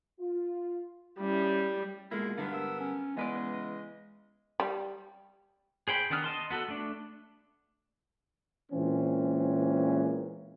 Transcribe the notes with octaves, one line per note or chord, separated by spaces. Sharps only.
F4
G3 C#4 E4
B2 G#3 A#3 E4 F4
G2 D3 B3 A#4 F5
E6
C#4
C#3 E3 G#3 B3 B4 D5 D#5
G3
G#4 C5 G5 B5
D#3 B3 D4 D#6 F6
D#5 A5 C6
B3 F#4 A4
A3 D4
A#2 E3 G#3 C4 C#4